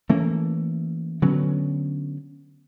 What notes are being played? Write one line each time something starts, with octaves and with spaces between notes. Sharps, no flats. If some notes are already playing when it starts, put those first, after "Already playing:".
E3 A3 A#3 C#4
D3 F#3 B3 C#4